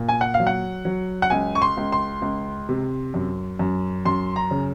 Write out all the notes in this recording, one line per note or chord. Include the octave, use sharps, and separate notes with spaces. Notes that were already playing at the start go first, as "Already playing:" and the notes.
Already playing: A#2
G#5
F#5
F5
F#3
F#5
F#3
F#5
C#2 G#5
C#6
C6
C#2
C6
C#2
C3
F#2
F#2
F#2 C6
A#5
C#3